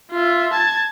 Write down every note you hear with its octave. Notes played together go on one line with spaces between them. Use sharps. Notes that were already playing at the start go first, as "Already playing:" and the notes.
F4 E5
A5 G#6